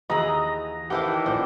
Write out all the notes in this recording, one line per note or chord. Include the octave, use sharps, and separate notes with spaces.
D#2 E3 F#4 G#4 D#5 A#5
A2 D#3 E3 G4 C5 F5 F#5
A1 A#2 C5 D5